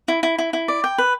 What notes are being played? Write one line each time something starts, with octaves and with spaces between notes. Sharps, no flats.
E4
E4
E4
E4
D5
G5
B4